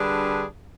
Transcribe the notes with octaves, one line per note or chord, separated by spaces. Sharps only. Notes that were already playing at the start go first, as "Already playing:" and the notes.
Already playing: D3 G3 D4 G#4 B4